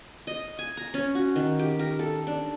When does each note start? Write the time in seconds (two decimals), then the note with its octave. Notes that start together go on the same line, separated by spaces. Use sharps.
0.27 D#5
0.59 G#5
0.77 A#5
0.94 C#4
1.15 F#4
1.36 D#3
1.59 G4
1.79 A#4
1.99 A4
2.27 D4